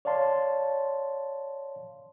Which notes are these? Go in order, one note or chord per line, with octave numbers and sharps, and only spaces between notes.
C#5 D5 F5 A5 C6